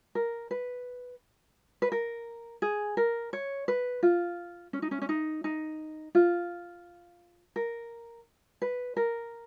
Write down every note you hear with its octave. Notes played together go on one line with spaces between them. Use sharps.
A#4
B4
B4
A#4
G#4
A#4
C#5
B4
F4
C#4
D#4
C#4
C#4
D#4
D#4
F4
A#4
B4
A#4